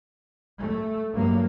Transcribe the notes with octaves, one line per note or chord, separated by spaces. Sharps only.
A3
G2 F#3 A#3